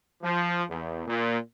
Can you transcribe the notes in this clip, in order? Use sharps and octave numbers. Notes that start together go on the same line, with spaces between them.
F3
E2
A#2